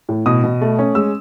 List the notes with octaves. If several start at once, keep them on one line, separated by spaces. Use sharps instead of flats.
A2
B2 D#6
B2
A3
C#4
G#3 E6